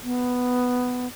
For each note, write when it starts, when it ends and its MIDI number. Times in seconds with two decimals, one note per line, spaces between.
0.04 1.07 59